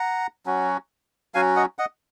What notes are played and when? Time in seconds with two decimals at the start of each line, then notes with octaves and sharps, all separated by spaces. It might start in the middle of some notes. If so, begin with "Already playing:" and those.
Already playing: F#5 A#5
0.46 F#3 C#4 F#4
1.34 F#3 C#4 F#4 F5 G#5
1.56 D#5 F#5
1.79 D#5 F#5